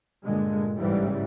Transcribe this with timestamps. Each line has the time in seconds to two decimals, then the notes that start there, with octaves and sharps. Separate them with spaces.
0.24 G2 A#2 D3 G#3
0.78 A1 G#2 C#3 E3 G3